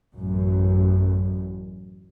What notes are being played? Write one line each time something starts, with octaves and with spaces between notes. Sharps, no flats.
A1 F#2